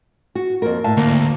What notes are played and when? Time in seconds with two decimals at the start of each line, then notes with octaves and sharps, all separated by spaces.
0.35 F#4
0.62 F2 A#3 A#4
0.84 A2 F5 A5
0.97 D2 A#3